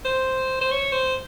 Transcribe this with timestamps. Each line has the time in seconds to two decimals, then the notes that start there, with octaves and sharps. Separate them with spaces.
0.05 C5
0.61 C5
0.71 C#5
0.92 C5